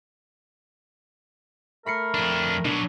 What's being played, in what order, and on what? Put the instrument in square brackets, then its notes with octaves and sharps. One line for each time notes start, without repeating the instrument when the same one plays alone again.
[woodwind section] A3 A#4 [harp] B5 C7 C#7
[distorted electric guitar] F2 D4
[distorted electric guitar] B2 F#3 [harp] D4